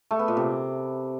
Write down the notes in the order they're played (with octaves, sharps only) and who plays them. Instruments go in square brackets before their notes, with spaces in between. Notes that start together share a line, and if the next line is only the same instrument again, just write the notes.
[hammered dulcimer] A3
B3
A#2
C3